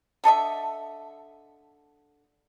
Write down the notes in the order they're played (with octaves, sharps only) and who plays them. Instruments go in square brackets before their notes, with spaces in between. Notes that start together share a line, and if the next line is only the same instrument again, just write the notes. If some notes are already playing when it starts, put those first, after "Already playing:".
[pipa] D3 A4 D#5 E5